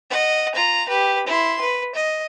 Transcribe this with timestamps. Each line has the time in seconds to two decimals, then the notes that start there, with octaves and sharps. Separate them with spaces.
0.10 D#5 F#5
0.54 F4 A#5
0.89 G4 B4
1.27 E4 C6
1.61 B4
1.94 D#5